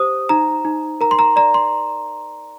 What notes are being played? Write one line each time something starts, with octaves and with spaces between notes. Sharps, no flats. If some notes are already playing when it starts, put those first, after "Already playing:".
Already playing: G4 C5 D#6
D#4 A#5
D#4
A#4 A#5
C6
A#5
D5 A#5
C6